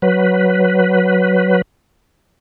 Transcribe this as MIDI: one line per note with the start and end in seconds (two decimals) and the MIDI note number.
0.02 1.62 54
0.02 1.62 71